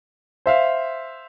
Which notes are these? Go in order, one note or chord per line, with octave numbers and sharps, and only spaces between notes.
C5 E5 F5